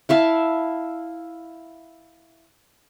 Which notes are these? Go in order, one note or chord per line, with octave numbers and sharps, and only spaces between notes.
E4 E5 F5 A5